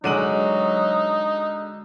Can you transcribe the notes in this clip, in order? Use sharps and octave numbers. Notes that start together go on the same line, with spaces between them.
D3 F#3 G#3 D#4 F#4 D5 D#7 F#7